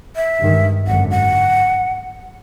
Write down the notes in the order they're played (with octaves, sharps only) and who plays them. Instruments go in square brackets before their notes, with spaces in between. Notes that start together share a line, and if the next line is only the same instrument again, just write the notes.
[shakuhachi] E5
[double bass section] G2 D#3 G#3
[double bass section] G#1 F#2 D3 [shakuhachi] F#5
[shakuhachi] F#5